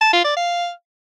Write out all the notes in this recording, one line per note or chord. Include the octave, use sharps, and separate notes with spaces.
A5
F4
D5
F5